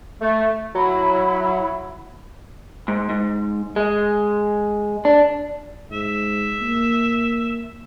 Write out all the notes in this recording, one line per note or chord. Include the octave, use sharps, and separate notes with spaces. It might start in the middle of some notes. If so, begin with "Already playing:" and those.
A3
F#3 E4 B5
G#2
G#2
G#3
D4
G#2 E5
A#3